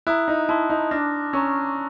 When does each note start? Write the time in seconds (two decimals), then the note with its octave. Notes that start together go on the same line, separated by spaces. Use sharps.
0.07 E4 A#5 D#6 F#6
0.28 D#4
0.49 E4 A5 C6 D#6
0.70 D#4
0.91 D4 D6 F6 A#6
1.33 C#4 A#5 C#6 E6